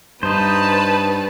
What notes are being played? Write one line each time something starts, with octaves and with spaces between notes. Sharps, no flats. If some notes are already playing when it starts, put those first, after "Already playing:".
G2 D#4 B4 C5 A5